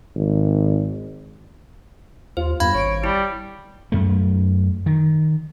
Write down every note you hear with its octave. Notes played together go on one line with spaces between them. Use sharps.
G#1
D#2 F4 C5
E2 G2 F5 B5 G#6
G#1 C#5 D7
G3 E4
F#2 A3
D#3